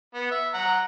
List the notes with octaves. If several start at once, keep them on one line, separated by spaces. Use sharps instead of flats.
B3
E5
F#5 A#5